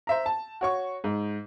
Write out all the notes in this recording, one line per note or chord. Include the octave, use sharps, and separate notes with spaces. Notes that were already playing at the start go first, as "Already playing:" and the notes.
C5 E5 A#5
A5
F#4 C#5 C#6
G#2